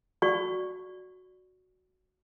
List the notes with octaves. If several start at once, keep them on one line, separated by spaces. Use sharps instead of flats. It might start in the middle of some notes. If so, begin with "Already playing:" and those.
F#4 D5 C#6